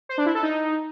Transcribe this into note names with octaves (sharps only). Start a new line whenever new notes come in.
C5
D4
E4
A4
D#4